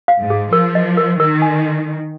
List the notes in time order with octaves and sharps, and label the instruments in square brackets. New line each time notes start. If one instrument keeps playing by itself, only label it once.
[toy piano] F5
[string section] G#2
[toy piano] G#4
[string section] F3 [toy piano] A#4
[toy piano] D#5
A#4
[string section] D#3 [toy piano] A#4
[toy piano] G#5